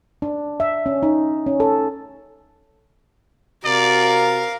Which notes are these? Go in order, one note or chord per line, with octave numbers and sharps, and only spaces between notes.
D4
E5
C#4
D#4
C#4
A4
C3 C4 F#4 A#4 D5 F5